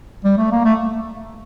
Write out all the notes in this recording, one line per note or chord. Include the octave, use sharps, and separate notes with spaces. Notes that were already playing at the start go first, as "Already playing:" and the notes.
G3
A3
A#3
A3